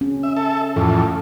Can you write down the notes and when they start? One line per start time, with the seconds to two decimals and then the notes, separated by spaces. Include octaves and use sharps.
0.01 C#4
0.23 E5
0.36 A4 E5
0.76 F2 A2 E3 A4